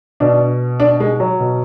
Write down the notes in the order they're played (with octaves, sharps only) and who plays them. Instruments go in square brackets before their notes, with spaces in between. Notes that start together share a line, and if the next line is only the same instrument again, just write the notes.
[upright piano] B2 D4
D4
G#3
F#3
B2